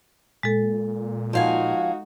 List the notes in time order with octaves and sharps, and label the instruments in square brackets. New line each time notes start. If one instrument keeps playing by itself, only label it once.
[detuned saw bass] A#2 [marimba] G#3 A4
[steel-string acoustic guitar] F3 F5 G#5 [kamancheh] D#4 F#4